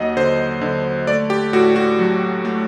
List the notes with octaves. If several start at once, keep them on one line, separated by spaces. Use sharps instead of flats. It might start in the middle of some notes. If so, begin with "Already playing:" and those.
Already playing: D#2 F#3 D#5 F#5
D3 C5
D3
A3 D5
G4
A2 F#4
F#4
F#3
A3